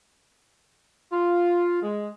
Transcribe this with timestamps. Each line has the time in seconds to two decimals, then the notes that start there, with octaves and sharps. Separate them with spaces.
1.13 F4
1.82 G#3